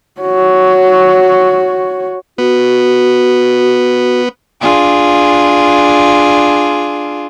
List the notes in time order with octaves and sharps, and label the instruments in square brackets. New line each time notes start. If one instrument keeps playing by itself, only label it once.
[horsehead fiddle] F#4 C#5
[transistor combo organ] B3 [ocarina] F#4
[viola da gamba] D4 F4 G#4